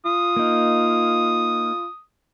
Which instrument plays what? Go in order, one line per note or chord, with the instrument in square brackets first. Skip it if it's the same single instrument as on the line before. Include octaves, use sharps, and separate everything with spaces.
[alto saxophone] F4 [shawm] D#6
[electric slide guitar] A#3 D#4